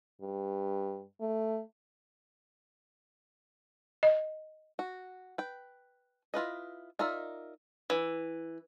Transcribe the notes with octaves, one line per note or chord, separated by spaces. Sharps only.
G2
A3
D#5
F#4
B4 G5
E4 F4 B4 D#5
D#4 F4 A#4 D5 E5
E3